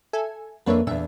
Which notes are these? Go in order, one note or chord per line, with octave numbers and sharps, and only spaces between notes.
A4 E5 G#5
F2 A#3 D4 B4 C#5 E5
E2 A#2 D4 E5